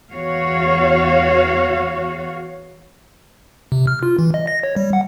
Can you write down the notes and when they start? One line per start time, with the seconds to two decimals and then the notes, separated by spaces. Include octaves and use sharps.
0.13 E2 F#4 C#5 F5
3.72 C3
3.87 F6
4.03 F4
4.19 E3
4.34 D#5
4.47 A#6
4.63 C#5
4.76 G3
4.93 F#5